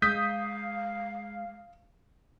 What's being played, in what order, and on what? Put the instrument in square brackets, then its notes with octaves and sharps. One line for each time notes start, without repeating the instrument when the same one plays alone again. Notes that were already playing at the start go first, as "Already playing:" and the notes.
[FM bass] G#3 [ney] F5 [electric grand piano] D#6 G6 B6